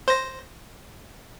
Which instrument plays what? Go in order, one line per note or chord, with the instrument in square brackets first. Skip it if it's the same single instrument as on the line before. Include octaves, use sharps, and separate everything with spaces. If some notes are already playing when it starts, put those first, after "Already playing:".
[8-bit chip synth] C5 A#6